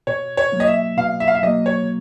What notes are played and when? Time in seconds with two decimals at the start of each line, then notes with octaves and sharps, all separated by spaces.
0.07 B2 C#5
0.37 C#5
0.52 F#3 A#3
0.60 D#5
0.68 E5
0.98 B2 F5
1.20 E5
1.28 F5
1.35 E5
1.43 F#3 A#3 D#5
1.66 C#5